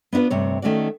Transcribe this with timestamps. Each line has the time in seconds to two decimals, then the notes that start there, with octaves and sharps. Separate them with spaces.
0.13 B3 D4 E4 F4 B4
0.30 D2 G2 C3 C#5
0.62 D#3 A3 C#4 F#4 D5